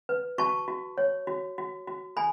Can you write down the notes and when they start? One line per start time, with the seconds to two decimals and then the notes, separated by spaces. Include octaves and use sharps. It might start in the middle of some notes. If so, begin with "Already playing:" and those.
0.09 B4
0.38 F#4 A5 C#6
0.68 F#4
0.98 C#5
1.27 F#4
1.58 F#4
1.88 F#4
2.16 A4 G#5 B5